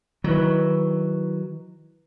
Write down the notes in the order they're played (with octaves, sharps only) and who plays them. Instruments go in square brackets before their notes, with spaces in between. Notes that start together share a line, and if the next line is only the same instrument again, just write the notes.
[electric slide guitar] D#3 E4 B4 [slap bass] F#3